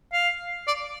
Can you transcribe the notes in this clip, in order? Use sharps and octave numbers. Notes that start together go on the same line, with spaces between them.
F5
D5